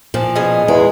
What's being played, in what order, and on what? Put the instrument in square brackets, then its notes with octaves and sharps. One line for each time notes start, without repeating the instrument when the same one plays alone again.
[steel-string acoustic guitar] A#2 F3
[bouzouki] B2 C#4 G#4
[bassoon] E2 [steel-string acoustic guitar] G#3